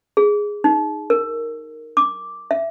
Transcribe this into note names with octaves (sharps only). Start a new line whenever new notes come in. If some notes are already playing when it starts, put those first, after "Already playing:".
G#4
D#4
A#4
D6
E5